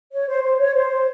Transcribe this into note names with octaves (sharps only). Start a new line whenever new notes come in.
C#5
C5
C5
C#5
C5